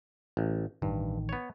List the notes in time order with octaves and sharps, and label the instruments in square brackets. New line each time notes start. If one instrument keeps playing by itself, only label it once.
[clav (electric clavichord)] A1
[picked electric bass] A1 D#3 [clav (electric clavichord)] G2
[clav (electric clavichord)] B3 C#5